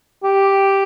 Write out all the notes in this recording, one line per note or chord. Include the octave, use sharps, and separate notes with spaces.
G4